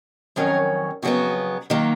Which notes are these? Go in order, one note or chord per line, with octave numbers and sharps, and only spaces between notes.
F2 D#3 F#3 C#4 A#4 C#5
F2 C#3 F#3 B3 F#4
D#3 F#3 A#3